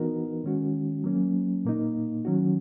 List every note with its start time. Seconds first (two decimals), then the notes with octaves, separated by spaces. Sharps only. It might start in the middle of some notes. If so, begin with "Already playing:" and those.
Already playing: E3 B3 D#4 F#4 A#4
0.44 D#3 G#3 C#4 F#4
1.04 F#3 A#3 C#4
1.65 A#2 A#3 D#4
2.25 D#3 F#3 C#4 F#4